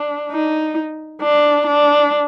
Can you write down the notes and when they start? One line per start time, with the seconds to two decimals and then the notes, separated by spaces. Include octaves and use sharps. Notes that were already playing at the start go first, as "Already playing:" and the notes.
Already playing: D4
0.31 D#4
1.22 D4
1.67 D4